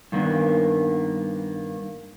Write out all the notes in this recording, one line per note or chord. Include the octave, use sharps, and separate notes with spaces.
G2 D#3 A#3 B3